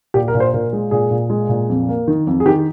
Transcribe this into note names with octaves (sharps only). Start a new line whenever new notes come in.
A#2 G4
A#4
A#2
C5
A#2 A#4
G#3
A#2 G#4
A#2
G#3
A#2
F2
A#3
D#3
F2
G#4
D#3 G4